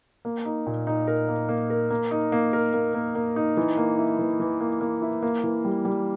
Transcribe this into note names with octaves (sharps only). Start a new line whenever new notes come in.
A#3
D#4
A#2
D#4
A#4
A#3
A#3
A#4
A#3
D#4
A#3
A#4
A#3
A#3
A#3
D#4
E3
A#3
E4
E3
E3
A#3
A#3
E4
A#3
E3
G3
G3